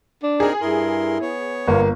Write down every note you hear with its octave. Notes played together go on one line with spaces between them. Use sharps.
D4
C4 D#4 G#4 A#4
G2 E4 A#4 C6
B3 C#5
G1 A#3